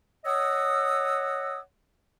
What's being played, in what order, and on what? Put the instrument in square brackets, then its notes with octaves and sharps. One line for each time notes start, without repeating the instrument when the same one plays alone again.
[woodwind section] C#5 D#5 F#5 D#6 E6